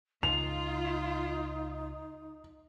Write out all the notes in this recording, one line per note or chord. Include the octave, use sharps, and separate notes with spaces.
C#2 D#4 F4 F7